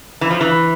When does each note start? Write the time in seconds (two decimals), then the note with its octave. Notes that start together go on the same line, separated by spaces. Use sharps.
0.21 E3
0.30 F3
0.41 E3